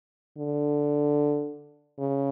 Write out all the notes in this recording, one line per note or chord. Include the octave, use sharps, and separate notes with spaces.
D3
C#3